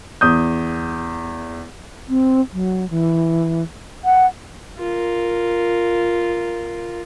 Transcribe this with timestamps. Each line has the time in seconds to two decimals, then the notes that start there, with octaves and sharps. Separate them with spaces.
0.21 E2 D#6 G6
2.09 C4
2.53 F#3
2.90 E3
4.05 F#5
4.78 F4 A#4